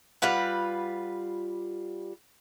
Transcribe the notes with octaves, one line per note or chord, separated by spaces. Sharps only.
G3 F4 B4 F#5